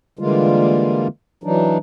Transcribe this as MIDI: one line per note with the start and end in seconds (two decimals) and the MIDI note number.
0.19 1.08 50
0.19 1.08 52
0.19 1.08 55
0.19 1.08 56
0.19 1.08 58
0.19 1.08 65
1.44 1.78 52
1.44 1.78 54
1.44 1.78 62
1.44 1.78 63